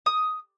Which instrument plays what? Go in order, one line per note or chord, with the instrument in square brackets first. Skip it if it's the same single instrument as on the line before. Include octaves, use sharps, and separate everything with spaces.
[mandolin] D#6